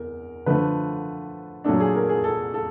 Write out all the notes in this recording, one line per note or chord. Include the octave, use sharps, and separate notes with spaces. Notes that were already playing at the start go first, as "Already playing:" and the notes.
Already playing: E2 A#4
D3 F3 A3 B4
A#2 F#3 A3 D4 A4
G#4
A#4
G#4
A4
A4